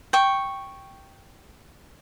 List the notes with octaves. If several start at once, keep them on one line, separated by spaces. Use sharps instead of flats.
G5 C#6